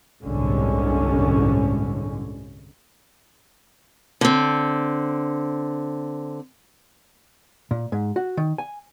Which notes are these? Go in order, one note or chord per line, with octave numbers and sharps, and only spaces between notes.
G1 C2 A2 D3 G#3 C#4
D3 C4
A#2
G#2
F#4
D#3
G#5